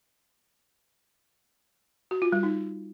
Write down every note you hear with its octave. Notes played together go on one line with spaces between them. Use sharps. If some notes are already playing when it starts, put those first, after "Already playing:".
F#4
F4
G3
D#4